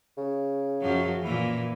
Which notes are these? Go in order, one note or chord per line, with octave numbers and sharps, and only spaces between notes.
C#3
F#2 F3 F#3
A#2 E3